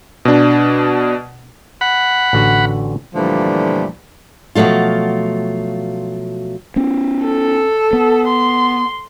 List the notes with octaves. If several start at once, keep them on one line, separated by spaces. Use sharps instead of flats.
B2 D4
F#5 B5
A1 D3 F#4
A#2 D3 E3 F3 G3 A3
B2 F3 F#3 A3 F4
B3 C#4
A4
B3
C6